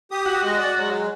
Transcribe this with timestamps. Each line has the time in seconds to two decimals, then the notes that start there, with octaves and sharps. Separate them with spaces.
0.11 G4 D#6
0.26 F#4
0.43 G#3 D#5
0.58 D5
0.78 F#3 G#3